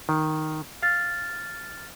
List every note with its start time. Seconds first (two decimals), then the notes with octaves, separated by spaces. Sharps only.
0.09 D#3
0.83 F5 F6 A6